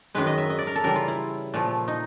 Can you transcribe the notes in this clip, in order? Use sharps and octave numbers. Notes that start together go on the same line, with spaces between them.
F#2 D#3 G#3 B4
D#5
E5
D#5
D5
A#4
A4
C#3 E3 G3 A#4
F4
E4
A#2 F3 A3
D#4